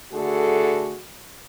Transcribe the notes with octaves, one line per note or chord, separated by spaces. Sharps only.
D3 A3 F#4 G#4 A4